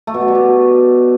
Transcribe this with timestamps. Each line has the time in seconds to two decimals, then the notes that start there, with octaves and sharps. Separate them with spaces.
0.07 A3
0.14 B2
0.21 A3
0.28 G3
0.35 B2